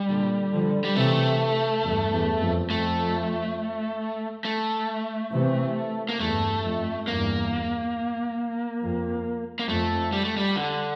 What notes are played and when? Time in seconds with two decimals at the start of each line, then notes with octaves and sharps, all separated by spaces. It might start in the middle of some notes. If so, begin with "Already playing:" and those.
Already playing: G3
0.08 A#2 D3
0.52 D3 F3
0.84 G3
0.96 C3 E3 A3
1.83 E2 G2
2.13 E2
2.42 F2
2.70 F2 A3
4.45 A3
5.32 C3 E3
6.09 A#3
6.20 E2 G2 A3
6.63 F2
7.06 E2 G2 A#3
8.82 F2
9.59 A#3
9.68 F2 A3
10.12 G3
10.25 A3
10.37 G3
10.56 D3